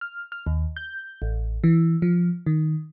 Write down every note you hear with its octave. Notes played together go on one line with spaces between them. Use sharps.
F6
F6
D#2
G6
A1
E3
F3
D#3